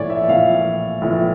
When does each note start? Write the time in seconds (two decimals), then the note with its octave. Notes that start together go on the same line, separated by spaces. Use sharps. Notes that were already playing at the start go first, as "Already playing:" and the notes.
Already playing: A#1 A2 E3 C#5 D5
0.10 E5
0.28 A#1 A2 E3 F5
1.01 A#1 A2 E3